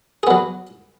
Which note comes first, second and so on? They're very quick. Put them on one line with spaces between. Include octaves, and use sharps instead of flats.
G#4 B3 F#3